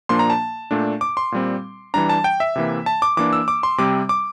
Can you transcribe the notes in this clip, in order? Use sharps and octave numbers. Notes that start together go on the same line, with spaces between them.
A#2 F3 A#3 D4 C6
A#5
A5
A#2 A3 D4
D6
C6
A#2 G3 C4
E3 G3 D4 A#5
A5
G5
E5
C3 E3 A#3
A5
D6
E3 A#3 D4 D6
E6
D6
C6
C3 G3 C4 D6
D6